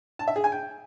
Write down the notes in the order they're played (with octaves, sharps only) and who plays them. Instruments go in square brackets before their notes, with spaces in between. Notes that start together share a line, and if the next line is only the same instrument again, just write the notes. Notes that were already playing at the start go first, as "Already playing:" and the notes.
[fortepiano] A5
E5
G#4
G#5
G5